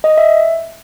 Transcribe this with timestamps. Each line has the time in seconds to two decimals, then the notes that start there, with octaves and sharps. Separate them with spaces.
0.04 D#5
0.18 E5